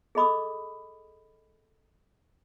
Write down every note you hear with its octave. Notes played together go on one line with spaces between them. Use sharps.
G#4 A4 D#5 B5 D6 D#6